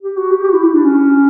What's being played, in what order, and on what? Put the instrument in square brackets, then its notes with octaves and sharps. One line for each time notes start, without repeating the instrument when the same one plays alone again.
[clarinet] G4
F#4
G4
G4
F#4
E4
E4
D4
C#4